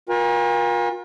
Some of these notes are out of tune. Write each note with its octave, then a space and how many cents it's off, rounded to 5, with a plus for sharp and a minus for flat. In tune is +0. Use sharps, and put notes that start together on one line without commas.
F4 +40 A#4 +40 G#5 -45